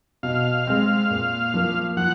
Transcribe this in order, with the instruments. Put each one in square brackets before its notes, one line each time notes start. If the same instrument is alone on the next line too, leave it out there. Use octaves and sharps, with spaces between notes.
[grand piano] B2 [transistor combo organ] F5
[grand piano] G#3 C4
A#2
F3 A#3
[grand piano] F3 [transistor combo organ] F#5